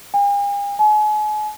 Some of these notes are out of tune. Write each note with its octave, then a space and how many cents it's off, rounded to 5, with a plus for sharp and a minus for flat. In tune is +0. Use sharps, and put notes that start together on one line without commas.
G#5 -45
G#5 +40